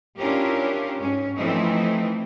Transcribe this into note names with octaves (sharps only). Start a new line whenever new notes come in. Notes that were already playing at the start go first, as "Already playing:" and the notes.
C#4 D4 E4 F4 G4 A#4
G#2 C#4
E3 F3 A3 C4 D#4 E4